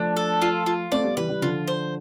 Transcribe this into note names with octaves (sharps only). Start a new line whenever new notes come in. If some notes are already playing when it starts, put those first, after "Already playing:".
Already playing: F3 A3 D4
A4
F4
F4
A3 C4 D5
G3 B3
E3 G3 B4
E3 G3
D3 F3 F4
C5